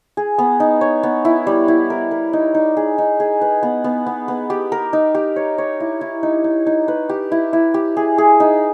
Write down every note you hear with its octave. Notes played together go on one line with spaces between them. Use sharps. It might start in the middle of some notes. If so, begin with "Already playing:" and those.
G#4
B3
D#4
C#5
B3
E4
G3
E4
A#4
A#4
D#4
D#4
G#4
D#4
G#4
B4
B3
B3
B3
B3
G4
A#4
D#4
G4
C#5
C#5
E4
E4
D#4
D#4
D#4
B4
G4
E4
E4
G4
G#4
G#4
D#4